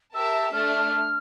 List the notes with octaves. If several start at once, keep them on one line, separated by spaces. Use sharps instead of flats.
G4 A#4 E5 A5 E6
A3 D4 A4 F6